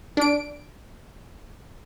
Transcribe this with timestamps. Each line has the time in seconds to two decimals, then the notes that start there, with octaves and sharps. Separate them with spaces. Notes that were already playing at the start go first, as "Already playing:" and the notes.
0.17 D4 D7